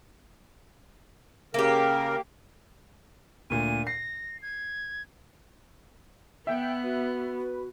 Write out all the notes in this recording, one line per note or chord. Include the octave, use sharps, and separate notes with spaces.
C#3 A#3 G4 A#4
D2 A#2 D#7
A#6 C7
G#6
B3 E5 G5
F#4 B4